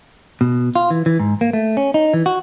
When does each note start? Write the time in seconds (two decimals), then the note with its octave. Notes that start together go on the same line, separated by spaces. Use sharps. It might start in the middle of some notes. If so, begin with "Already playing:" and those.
0.41 B2
0.76 F4
0.90 E3
1.06 E3
1.20 G#2
1.41 A#3
1.53 A3
1.77 C#4
1.94 D#4
2.13 E3
2.26 F#4